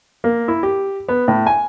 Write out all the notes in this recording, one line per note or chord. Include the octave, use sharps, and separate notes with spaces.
A#3
E4
G4
B3
A2
G#5